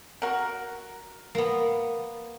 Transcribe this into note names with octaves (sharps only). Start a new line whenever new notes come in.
F#4 A#4
A#3 B3